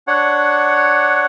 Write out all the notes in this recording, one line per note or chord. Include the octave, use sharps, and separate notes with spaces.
D4 C#5 F#5